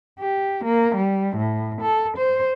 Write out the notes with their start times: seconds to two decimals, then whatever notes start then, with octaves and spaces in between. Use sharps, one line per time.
0.19 G4
0.65 A#3
0.96 G3
1.37 A2
1.82 A4
2.18 C5